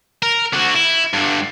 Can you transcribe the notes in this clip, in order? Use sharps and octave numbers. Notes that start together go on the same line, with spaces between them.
A#4
D3 F#4
E4
G2 D3